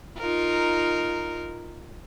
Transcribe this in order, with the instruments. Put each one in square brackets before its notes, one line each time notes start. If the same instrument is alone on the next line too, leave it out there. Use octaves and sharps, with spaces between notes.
[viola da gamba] D#4 F4 A#4